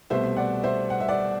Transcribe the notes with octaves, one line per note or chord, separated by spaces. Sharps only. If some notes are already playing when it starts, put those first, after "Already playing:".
C2 B2 A3 C5 E5
D5 F#5
C5 E5
F#5
E5
D5 F#5